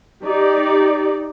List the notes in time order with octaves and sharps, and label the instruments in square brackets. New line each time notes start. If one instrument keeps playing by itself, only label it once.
[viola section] D#4 G4 D5